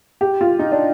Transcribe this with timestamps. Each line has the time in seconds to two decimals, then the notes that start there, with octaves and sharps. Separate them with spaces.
0.21 G4
0.41 F4
0.59 D#4
0.72 D4